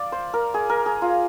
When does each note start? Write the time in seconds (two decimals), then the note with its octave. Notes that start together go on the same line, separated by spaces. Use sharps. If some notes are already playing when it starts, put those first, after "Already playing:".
Already playing: D5 F5
0.12 C5
0.34 A#4
0.54 G#4
0.70 A#4
0.86 G#4
1.02 F4